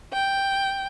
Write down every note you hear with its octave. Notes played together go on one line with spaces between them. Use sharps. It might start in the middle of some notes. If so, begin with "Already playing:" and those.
G5